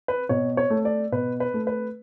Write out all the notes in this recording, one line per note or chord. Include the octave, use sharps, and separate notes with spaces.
B4
B2 C#5
C#5
A3
D5
B2 B4
B4
A3
B4